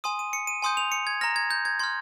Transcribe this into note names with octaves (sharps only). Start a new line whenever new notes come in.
G#5 C6 D#6 D#7
D#7
C#7
D#7
G#5 C6 D#6 G6
F7
C#7
G#6
A#5 F6 A#6
G#6
G6
G#6
C6 F6 G#6